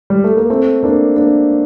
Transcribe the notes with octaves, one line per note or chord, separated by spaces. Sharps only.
G3
A3
A#3
A3 C4
A#3 D4
A#3 D4